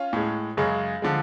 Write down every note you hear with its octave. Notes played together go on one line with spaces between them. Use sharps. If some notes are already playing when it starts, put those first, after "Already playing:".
Already playing: C#4 F4
A2 G#3
F#2 C#3 G#3
D3 F3 G#3